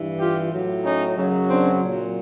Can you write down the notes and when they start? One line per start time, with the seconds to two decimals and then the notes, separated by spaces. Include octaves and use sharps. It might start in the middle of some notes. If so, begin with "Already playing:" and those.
Already playing: G2 E3
0.19 F4 G4
0.51 A2 F#3
0.84 C#4 D#4
1.17 F#2 C#3 F#3
1.49 C4 D4
1.82 A#2
1.87 F#3